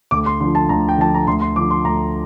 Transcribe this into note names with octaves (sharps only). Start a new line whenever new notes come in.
D2 D6
C6
D3 F3 C6
A5
D2 A#5
G5
D3 F3 A5
A#5
D2 C6
C6
D3 F3 D6
C6
D2 A#5